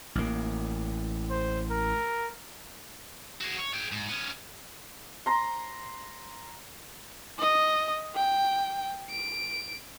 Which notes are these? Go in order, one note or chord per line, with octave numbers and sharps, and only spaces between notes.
A1 A#3
C5
A#4
F#4 G#4
C#5
G#4 G5
G#2
B3 C#4
A#5 C6
D#5
G5
D7